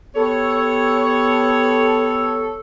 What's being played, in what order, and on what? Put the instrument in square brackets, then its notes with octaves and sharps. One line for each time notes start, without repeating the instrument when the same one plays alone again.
[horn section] B3 G4 C#5 [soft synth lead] A4